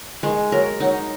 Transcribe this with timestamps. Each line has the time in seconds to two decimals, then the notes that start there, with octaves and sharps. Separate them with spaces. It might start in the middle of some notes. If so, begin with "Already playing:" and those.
0.23 D#3 G#3
0.52 F#3 A#4
0.80 F#3 D#4